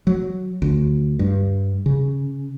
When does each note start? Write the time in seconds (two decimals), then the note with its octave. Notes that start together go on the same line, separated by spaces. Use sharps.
0.07 F#3
0.62 D2
1.19 G2
1.86 C#3